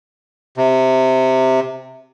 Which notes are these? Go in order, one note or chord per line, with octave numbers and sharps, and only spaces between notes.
C3